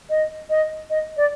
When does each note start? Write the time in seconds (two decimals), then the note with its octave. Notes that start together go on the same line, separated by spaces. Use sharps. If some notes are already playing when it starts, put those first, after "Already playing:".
0.10 D#5
0.50 D#5
0.90 D#5
1.17 D5